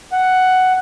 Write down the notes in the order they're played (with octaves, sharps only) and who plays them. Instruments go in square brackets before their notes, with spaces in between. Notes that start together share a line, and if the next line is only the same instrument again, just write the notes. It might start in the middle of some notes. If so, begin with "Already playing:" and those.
[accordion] F#5